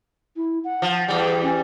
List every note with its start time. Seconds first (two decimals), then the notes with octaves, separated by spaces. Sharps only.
0.36 E4
0.64 F#5
0.82 F3
1.08 E2 G3
1.42 C#4